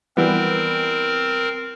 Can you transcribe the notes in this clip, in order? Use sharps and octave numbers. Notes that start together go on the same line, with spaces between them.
E3 G3 B3 C4 A#4